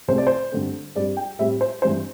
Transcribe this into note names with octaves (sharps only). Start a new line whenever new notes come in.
C2 C3 A3 C4 C5
D5
C5
G2 D3 A3 C4
G2 G3 C4 D5
G5
A2 G3 C4 E5
C5
G2 E3 G3 C4 C5